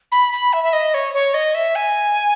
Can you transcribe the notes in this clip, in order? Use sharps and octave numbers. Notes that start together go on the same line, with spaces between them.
B5
B5
E5
E5
D#5
C#5
C#5
D#5
E5
G#5